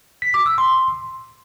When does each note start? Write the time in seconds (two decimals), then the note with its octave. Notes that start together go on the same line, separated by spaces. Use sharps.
0.22 B6
0.34 D6
0.46 E6
0.58 C6